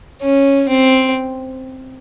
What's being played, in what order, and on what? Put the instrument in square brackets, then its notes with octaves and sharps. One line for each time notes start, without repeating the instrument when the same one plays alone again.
[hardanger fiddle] C#4
C4